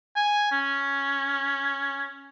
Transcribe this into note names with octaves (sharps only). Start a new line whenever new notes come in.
G#5
C#4